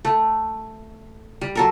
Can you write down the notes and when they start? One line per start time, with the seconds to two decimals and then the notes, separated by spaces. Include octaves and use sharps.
0.05 A3
1.41 G3
1.55 F#3 A4 A#4